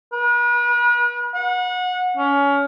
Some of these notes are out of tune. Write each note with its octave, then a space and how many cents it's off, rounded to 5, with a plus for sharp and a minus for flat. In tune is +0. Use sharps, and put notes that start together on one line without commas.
B4 -40
F#5 -30
C#4 +25